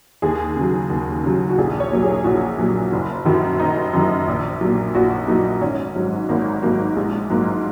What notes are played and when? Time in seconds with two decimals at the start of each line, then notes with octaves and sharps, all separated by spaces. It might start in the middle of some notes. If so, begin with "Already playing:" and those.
0.22 D#2 G#4
0.56 C#3 F#3
0.90 D#2
1.24 C#3 F#3
1.50 F#4
1.58 A#1 G#4
1.80 C#5
1.92 A#2 F#3
2.02 G#4
2.24 A#1 F#4
2.58 A#2 F#3
2.93 F#1
3.25 F#2 D#3 F#3
3.60 F#1 D#4
3.93 F#2 D#3 F#3
4.28 A#1
4.61 A#2 F#3
4.95 A#1 F#4
5.27 A#2 F#3 D#4
5.61 G#1 C#4
5.96 G#2 F#3
6.29 G#1 A#3
6.63 G#2 F#3 A#3
6.96 A#1 G#3
7.30 G#2 F#3 A#3